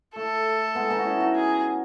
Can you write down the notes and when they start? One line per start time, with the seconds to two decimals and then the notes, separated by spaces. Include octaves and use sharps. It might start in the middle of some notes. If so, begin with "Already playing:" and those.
0.16 A3 A4
0.75 G#3 B3
0.91 B3 D#4
0.99 F#4
1.05 C#4 E4
1.20 D#4 F#4
1.35 G#4